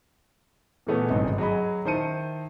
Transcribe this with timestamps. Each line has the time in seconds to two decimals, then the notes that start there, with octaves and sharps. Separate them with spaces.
0.87 A#2 C#3 E3 A3 B3 C#4
1.09 G#1 G2 C3 D#4
1.38 F#3 G#4 D#5 B5
1.85 D#3 E4 C5 A5 C#7 D#7